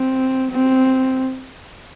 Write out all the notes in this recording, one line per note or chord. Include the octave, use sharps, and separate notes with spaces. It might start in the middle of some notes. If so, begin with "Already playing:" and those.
Already playing: C4
C4